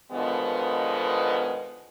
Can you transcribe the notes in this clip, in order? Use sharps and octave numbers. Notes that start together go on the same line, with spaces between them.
B2 D3 D#3 F3 G#3 B3